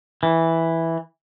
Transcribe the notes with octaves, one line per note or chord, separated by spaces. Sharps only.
E3